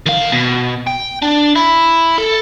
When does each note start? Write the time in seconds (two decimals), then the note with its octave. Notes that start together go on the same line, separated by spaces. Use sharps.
0.06 D#3 F5
0.32 B2
0.87 G5
1.22 D4
1.56 E4
2.18 A4